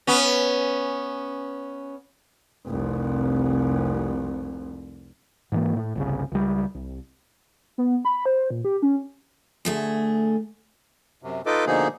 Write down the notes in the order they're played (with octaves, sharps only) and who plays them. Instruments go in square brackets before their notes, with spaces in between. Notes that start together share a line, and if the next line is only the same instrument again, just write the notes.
[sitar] B3 C#4
[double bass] F1 C2
[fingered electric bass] G#2 E3 A#3
A2
G1 C2 C#3
C#2 G3
C2
[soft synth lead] B3
B5
C5
A#2
G4
C#4
[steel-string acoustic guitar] D2 A3 G#4
[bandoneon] F#2 C3
D#4 F4 A4 B4 D#5 D6
B2 D3 F3 A#3 D#4 G#4